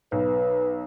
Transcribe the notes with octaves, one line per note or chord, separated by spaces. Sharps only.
B1 B4